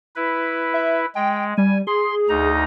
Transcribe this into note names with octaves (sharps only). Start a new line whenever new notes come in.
E4 B4
E5
G#3 G5
G3 G#5
G#4 C6
D2 D#4 A#5